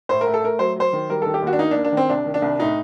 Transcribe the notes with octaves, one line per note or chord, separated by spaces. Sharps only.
A2 C5
A#4
A3
A4
A3 A#4
F#3 C5
F#3 C5
D#3
G3 A#4
D#3 A4
G4
D#2 F#4
D4
A#3 D#4
D4
A#3
D4
D#3 C4
C2 D4
D#3
D4
C2
A2 D#4